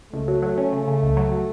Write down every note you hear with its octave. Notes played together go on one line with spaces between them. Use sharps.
C#2 A3
F#3
F#3
C#4
C#3
C#3
C#2
F#3
F#3